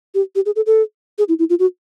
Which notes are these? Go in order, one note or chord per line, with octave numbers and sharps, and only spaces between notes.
G4
G4
G#4
A4
A4
G#4
E4
E4
F4
F#4